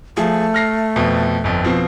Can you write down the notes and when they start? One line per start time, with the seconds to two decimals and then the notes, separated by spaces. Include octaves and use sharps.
0.17 F3 A3 G#4
0.54 F6 A#6 C7
0.96 F2 B2
1.44 G1 F2
1.64 B2 F3 C4